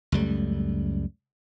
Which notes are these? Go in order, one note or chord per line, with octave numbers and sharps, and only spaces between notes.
C#2 F#2 G3 A3